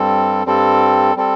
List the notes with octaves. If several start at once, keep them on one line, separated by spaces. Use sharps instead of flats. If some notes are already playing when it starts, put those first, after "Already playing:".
Already playing: G2 G3 C4 A4
G2 G3 C4 A4
G3 C4 A4